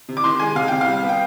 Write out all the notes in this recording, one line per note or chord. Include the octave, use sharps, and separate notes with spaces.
C3
D6
D#3 C6
G#3 G#5
C3 F5
C3 G5
F5
G3
B3
G5